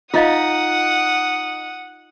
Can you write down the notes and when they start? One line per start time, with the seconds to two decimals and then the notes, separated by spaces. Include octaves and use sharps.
0.14 D#4 F4 D#5 F5 F#5 D#6